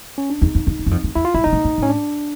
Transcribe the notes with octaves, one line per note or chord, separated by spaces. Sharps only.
C#4
D4
E2 D#4
F2
F2
E2
F#2
F2
F2
E2 E4
F4
G2 E4
A#2 D#4
A2
A#2
A2 C#4
D4